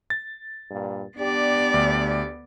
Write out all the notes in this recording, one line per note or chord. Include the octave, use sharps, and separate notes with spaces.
A6
G2 A#2
B3 D4 G4 D5
D2